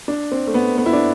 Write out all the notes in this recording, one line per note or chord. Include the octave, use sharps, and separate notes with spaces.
D4
C4
A3
B3
B3
E4
D4